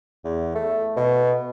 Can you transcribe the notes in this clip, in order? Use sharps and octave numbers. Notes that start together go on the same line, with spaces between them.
E2
A3
B2